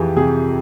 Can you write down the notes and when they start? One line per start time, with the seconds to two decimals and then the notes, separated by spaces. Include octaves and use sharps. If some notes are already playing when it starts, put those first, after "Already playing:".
Already playing: F2 E3 G4 G#4
0.16 C3 G#4